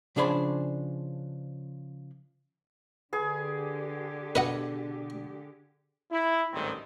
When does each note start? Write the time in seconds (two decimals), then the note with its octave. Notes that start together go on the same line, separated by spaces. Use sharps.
0.16 C#3 F3 D4 G#4 C5 B5
3.13 D3 G4 G#4 B4
4.35 B2 D4 F#4 B4 D#5 F#5
6.11 E4
6.53 A1 D2 G#2 D#3 G3 C4